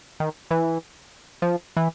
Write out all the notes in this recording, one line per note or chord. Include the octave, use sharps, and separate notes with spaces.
D#3
E3
F3
E3